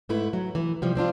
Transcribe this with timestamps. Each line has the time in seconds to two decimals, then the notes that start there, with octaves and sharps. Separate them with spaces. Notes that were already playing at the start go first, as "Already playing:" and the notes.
0.09 G#2 A3 E4 B4
0.33 F#3
0.55 E3
0.82 C3 F3 G3
0.95 F3 C4 D4 F4